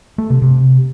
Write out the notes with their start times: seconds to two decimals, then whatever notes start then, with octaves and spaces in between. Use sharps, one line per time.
0.18 A3
0.30 C3
0.42 C3